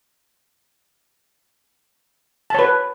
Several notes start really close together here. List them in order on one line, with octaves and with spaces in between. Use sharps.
A5 C#5 B4